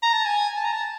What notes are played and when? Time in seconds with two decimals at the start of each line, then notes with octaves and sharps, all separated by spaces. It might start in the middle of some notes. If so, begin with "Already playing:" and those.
0.03 A#5
0.13 A5
0.25 G#5
0.57 A5
0.65 A#5
0.72 A5